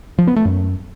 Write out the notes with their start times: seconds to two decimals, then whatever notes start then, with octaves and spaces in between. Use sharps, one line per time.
0.18 F3
0.27 B3
0.36 A3
0.45 F#2